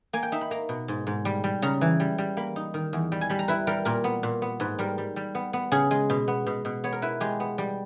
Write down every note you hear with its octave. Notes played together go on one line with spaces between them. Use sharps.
A#3 G#5
G5
D#4 E5
B5
A#3 A#5
B2
G#2
G#2
G3
G3
C#3 A#5
E3
G3
G3
A#3 B5
D#4
D#3
E2
G3
G#5
G3 B5
A#5
E4 B4
G3 A#4
A#2 A#4
B3
A#2
B3
G#2 B4
G3 A#4
G3
G3
B3
B3
C#3 G#4
G#3
B2
B3
B2
B2
B3 C#5
A#4
E4 B4
G#3 G4
B3
G3